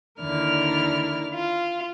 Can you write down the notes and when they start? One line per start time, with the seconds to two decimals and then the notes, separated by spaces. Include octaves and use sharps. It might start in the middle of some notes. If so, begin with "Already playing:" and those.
0.22 D#2 D3 E4 A#4 D5 F6
1.34 F4